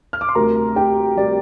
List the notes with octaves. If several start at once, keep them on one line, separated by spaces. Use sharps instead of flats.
F6
D6
C6
D2 C3 G3 A#4 A#5
G4 G5
C3 G3 D5